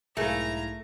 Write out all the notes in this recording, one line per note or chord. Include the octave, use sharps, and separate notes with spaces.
B1 G#2 A3 E4 G#4 A#4 F5 A#5